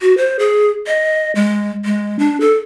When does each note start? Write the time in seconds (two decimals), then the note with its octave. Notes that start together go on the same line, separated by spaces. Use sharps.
0.01 F#4
0.18 C5
0.39 G#4
0.87 D#5
1.35 G#3
1.85 G#3
2.19 D4
2.40 A4